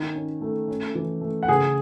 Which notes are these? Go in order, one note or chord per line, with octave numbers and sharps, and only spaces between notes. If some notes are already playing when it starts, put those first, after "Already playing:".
Already playing: D#3
C#4
A3
C#4
E3
A3
F#5
C#3 G#4 G#5